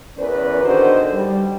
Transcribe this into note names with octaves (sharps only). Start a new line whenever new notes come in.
E2 C#4 A#4 B4 D5
D3 D#3 F#4 C5 D#5
G3